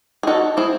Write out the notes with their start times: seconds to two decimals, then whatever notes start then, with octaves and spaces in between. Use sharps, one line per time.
0.23 G#4
0.27 D#4 F#4 A4
0.57 C4 E4 G#4